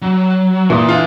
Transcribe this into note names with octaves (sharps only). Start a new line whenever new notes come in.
F#3
A#2 E3 A#4 C6 D#6
D3 F4